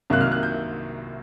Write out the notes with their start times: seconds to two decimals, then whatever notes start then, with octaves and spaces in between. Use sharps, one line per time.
0.10 C2 C3 D#3 F#3 A#3 F#6
0.21 F6
0.32 F#6
0.43 G6